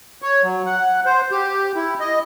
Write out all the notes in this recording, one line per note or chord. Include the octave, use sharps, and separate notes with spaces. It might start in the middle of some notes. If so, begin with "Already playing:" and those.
C#5
F#3
F#5
C5
G4
E4
D#5